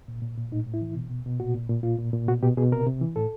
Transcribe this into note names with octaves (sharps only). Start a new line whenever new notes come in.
A#2
A#2
A#2
A2 D#4
A2
E4
E3
B2
B2
B2
A#2 F#4
A#2
A#2
A#2 F4
A#2
A#2
B2 F#4
B2 G4
B2 G#4
C3 A#4
C3
E3
A2 A4